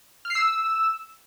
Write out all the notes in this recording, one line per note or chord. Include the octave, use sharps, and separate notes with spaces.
F6
C7
E6